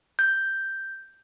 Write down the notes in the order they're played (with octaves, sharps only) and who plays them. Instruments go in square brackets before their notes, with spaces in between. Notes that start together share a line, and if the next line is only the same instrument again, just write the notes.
[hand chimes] G6